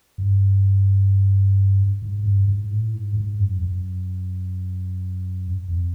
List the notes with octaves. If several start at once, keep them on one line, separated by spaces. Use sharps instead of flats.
G2
G#2
G2
G#2
A2
G#2
G#2
F#2
F#2
F2